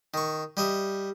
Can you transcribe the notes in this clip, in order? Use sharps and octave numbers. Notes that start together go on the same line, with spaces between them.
D#3 C#6
G3 D#5 E5